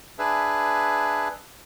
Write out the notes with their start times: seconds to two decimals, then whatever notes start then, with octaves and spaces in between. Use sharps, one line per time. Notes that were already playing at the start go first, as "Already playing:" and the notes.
0.19 D4 G#4 B4 E5